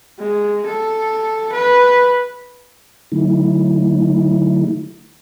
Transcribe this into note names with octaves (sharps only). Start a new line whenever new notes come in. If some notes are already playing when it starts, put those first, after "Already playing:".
G#3
A4
B4
D3 F#3 A3 D#4 E4